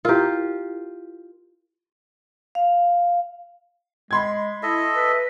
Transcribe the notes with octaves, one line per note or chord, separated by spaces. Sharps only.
E4 F4 G4 A#4
F5
G#3 B5 C6 G#6
E4 A4 D#5 E5
B4